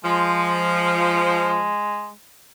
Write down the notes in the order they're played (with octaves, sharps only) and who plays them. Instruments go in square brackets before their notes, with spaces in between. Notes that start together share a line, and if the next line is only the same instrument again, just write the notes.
[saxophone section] F3 [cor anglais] G#3